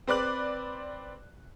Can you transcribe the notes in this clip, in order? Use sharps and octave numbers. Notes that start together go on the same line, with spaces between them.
C4 B4 D5 F#6 F#7